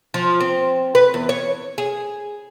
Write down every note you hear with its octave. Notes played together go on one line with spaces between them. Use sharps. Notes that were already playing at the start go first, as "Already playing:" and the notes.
F3
C4
B4
E2
C#5
G#4